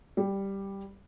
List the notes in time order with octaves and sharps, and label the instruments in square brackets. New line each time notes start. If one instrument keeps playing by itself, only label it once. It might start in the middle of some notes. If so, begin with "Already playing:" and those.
[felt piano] G3